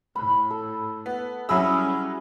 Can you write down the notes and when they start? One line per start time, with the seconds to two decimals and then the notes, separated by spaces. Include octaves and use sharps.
0.16 A2 B5
0.50 A4
1.06 B3
1.49 F#3 G3 C#4 E4 G#4 B5 E6